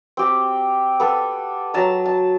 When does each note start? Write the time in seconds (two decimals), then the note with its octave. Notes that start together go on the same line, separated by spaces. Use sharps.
0.17 C4 G4
1.00 B3 A4
1.74 F#3 A5 A#5
2.06 A5